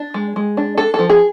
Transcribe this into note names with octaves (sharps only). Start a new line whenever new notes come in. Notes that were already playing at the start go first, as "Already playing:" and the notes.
Already playing: D4
G#3
G#3
D4
D4 A4
F3 A4
G#4